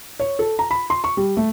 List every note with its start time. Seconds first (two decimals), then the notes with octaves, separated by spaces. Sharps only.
0.20 C#5
0.39 A4
0.59 A#5
0.71 B5
0.90 C6
1.04 C#6
1.17 G3
1.37 A3